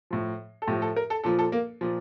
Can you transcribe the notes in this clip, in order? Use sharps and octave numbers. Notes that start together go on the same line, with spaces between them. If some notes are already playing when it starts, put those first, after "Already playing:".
A2 F3
A4
A2 F3 G4
A4
A#4
A4
A#2 F3 A4
A4
A#3
A#2 F3